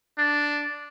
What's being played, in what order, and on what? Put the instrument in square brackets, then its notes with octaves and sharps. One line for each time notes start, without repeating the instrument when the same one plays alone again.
[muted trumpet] D4